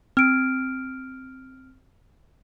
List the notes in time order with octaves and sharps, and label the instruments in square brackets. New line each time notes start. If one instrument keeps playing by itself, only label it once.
[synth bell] C4 [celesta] F6 D7